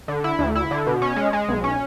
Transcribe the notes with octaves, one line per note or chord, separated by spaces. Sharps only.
D3
E4
D2
E4
D3
B2
C#4
G#3
G#3
B1
C#4